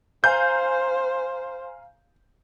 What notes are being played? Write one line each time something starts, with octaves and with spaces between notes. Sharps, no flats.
C5 F5 G#5 A#5 G6